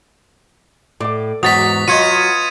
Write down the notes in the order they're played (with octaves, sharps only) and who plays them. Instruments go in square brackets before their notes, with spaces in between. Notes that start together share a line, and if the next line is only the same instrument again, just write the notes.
[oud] A2 [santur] D5 D6
[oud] E2 G#2 F#3 [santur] F#4 [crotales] D#6 A6 B6
[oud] F#3 [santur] F4 B4 D#5 [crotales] G#6 C#7 D#7